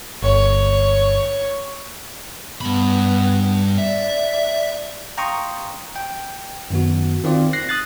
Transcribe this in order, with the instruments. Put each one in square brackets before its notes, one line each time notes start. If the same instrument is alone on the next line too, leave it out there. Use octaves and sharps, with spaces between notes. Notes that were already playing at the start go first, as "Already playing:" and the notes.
[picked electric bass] G1 [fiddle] C#5
[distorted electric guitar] G2 B5 [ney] B3
[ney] D5 [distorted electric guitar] E5
[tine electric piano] F5 G5 A#5 C6 C#6 D#6
G5
F#2 D#3 B3 F#4
D#3 C4 F4 D5
F#6 A#6 C7
D#6 F#6 A6